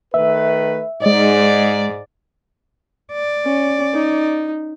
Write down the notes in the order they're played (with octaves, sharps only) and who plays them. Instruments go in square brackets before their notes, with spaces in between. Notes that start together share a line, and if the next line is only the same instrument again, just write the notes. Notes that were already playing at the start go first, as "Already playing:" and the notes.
[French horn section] D#3 A3 B4 [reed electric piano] E5
[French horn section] G#2 [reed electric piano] G#3 D#5 [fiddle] D5
[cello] D5
[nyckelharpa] C#4
D#4